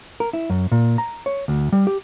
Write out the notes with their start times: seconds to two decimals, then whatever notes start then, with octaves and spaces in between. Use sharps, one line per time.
0.20 A#4
0.33 E4
0.50 F#2
0.72 A#2
0.98 A#5
1.26 C#5
1.48 D2
1.72 G3
1.87 G4